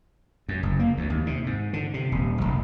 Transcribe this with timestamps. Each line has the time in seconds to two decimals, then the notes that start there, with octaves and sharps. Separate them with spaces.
0.49 F#2
0.63 F#1
0.79 A#3
0.97 D2
1.10 D#2
1.27 C3
1.46 G#2
1.73 D3
1.94 C3
2.12 D#1
2.41 F1